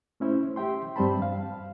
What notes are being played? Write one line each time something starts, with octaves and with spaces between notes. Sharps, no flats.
A3 C#4 E4 C5
G4 E5 G5 C6
G2 G3 C4 C5 A5 B5
F5